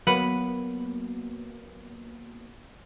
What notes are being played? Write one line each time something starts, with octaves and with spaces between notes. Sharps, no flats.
F#3 A#3 B3 B4 F#5